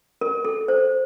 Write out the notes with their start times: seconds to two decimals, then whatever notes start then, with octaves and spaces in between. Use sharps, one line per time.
0.21 A#4
0.45 A4
0.68 C5